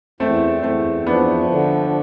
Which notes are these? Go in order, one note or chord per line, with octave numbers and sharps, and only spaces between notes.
E2 A3 C4
E2 A3 C4
F3 B3 D4
D3